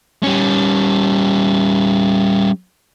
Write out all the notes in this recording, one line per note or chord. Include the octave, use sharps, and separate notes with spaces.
G3 C#4